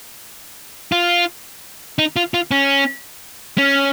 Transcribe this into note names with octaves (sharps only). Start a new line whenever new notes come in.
F4
D#4
F4
F4
C#4
C#4